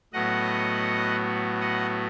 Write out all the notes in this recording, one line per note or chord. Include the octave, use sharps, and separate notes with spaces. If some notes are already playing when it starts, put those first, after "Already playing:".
A2 F#3 B3 D#5 F#5
D#5 F#5